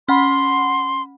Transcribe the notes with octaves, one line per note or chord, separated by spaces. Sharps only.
C#4 F#5 B5 C6